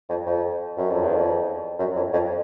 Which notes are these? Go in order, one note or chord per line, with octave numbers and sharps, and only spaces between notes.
F2
F2
F#2
F2
E2
F2
F#2
F2
F2